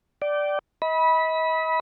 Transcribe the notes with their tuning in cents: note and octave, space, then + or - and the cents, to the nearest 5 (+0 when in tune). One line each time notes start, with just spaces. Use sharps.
D5 +0 G5 -30
D#5 +40 B5 -15